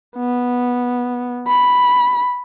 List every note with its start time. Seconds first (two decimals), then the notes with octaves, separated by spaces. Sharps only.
0.17 B3
1.48 B5